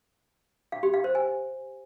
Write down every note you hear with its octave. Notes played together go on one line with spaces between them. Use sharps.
F5
G4
F5
C5
G#5